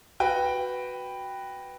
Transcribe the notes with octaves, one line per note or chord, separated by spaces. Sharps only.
F#4 B4 G5